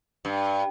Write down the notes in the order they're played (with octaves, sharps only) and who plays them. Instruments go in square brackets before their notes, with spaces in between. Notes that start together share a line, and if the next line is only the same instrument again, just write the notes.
[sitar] G2